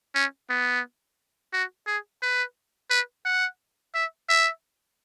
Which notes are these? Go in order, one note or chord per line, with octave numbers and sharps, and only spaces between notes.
C#4
B3
F#4
G#4
B4
B4
F#5
E5
E5